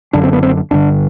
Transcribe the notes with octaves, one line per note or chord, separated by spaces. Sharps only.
F#1 F#2 D3 D4
C4
B3
C4
G1 G2 D3 D4